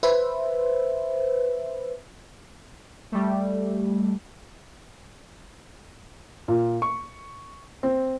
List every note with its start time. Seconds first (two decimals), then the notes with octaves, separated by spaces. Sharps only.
0.03 B4 C5 E5
3.12 G3 A3
6.48 A#2
6.82 C#6
7.83 C4